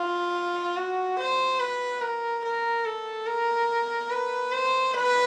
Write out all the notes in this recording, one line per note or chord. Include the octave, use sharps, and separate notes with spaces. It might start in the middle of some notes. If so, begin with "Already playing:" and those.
Already playing: F4
F#4
C5
B4
A#4
A#4
A4
A#4
B4
C5
B4